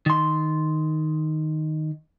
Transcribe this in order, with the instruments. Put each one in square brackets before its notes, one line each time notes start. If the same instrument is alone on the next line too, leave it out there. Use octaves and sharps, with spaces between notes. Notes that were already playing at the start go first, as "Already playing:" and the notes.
[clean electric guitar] D#3 C6